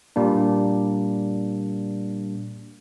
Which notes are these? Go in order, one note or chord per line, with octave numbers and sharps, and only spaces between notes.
A#2 G3 A#3 D4